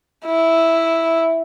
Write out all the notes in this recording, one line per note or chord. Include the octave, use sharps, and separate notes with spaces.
E4